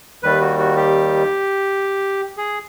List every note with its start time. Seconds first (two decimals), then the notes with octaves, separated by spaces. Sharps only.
0.23 D#2 D#3 G3 B4
0.41 F#4
0.59 F#4
0.77 G4
2.37 G#4